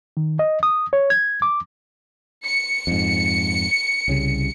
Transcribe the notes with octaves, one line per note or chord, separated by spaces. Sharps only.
D#3
D#5
D#6
C#5
G#6
D6
C#7
F2 G#2
C2 C#3 G3